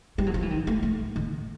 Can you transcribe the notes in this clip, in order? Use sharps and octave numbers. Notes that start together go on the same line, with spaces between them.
G3
F#3
F3
E3
D#3
A3
A3
D#3